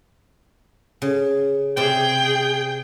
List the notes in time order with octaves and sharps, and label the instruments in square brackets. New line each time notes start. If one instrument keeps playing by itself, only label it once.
[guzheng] C#3
[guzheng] C3 C5 D5 [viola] G#4 G5